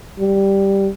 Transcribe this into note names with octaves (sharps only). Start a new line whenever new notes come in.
G3